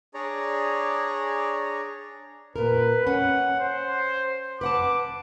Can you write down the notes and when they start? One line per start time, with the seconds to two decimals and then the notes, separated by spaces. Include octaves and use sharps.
0.14 D4 G#4 C#5 D5 A#5
2.56 A#2 A#4 B4
3.07 C#4 F#5
3.60 C5
4.61 B4 F#5 A5 D6